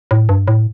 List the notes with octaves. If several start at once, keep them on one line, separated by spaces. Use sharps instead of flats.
A2
G2
A2